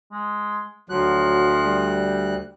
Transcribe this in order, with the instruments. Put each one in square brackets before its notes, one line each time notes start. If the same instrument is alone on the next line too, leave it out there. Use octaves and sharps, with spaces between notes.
[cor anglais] G#3
[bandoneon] D2 F#6 [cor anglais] F3 [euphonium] F#3
[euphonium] G3